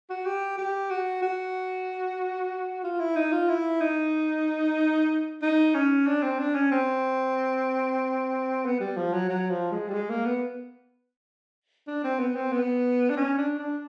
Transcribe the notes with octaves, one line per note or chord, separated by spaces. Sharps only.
F#4
G4
G4
F#4
F#4
F4
E4
D#4
F4
E4
D#4
D#4
C#4
D4
C4
D4
C#4
C4
B3
G3
F3
F#3
F#3
F3
G#3
G3
G#3
A#3
B3
D4
C4
B3
C4
B3
D4
C#4
D4
D4